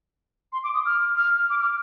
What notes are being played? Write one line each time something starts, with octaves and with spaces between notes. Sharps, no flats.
C6
D6
D#6
F6
F6
D6
F6